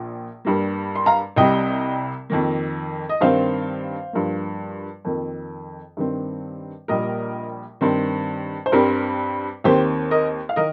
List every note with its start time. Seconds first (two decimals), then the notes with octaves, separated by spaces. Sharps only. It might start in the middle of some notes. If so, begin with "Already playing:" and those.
Already playing: A#1 A#2
0.45 G2 G3 A#3
0.95 C6
1.06 F5 A#5
1.36 C2 C3 G3 D#5 G5
2.30 F2 D#3 A#3
3.09 D#5
3.21 G2 D#3 C4 C5 F5
4.13 G2 F3 A#3
5.04 F2 D#3 A#3
5.97 G2 D#3 C4
6.88 A#1 A#2 G3 A#3 A#4 D#5
7.81 G2 D#3 C4
8.66 C5
8.72 G2 G3 C4 A#4
9.64 D#2 D#3 C4 G4 C5
10.11 A#4 D#5
10.49 F5
10.56 D#3 A#4 D#5